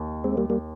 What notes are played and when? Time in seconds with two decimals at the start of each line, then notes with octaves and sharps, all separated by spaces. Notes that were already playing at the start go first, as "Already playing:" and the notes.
Already playing: D#2
0.24 G#3 C4
0.37 G3 A#3
0.50 G3 A#3